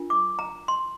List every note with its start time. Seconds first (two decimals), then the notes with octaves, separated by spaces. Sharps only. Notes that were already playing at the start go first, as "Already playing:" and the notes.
Already playing: D4 F4 A#4
0.10 D6
0.39 A#5
0.68 C6